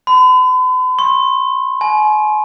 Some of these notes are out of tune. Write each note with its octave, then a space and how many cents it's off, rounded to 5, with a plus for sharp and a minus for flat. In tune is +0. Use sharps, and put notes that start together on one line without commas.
B5 +45
C6 +45
G#5 +40